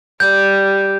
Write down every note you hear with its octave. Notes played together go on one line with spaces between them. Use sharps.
G3 G6